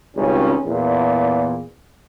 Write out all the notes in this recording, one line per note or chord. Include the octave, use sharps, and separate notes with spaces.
G#1 C#2 G3 C#4
E2 A#2